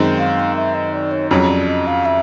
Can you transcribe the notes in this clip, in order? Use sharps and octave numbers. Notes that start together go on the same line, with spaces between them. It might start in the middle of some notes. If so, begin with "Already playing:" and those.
Already playing: F#2 D#3 G#3 C4
F5
E5
D#5
D5
C#5
F2 C#3 F#3 C#5
D5
D#5
F5
E5